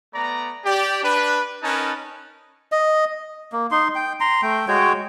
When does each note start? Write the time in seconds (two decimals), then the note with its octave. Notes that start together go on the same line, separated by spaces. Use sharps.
0.14 A3 B3 D5 A#5
0.65 G4 D5
1.03 D4 B4
1.61 C#4 D#4 A#4 B4 G#5 A5
2.72 D#5
3.53 A#3
3.71 D#4 C6
3.95 G5
4.20 A#5 C6
4.42 A3 G5
4.68 G#3 F#4 C#5 G5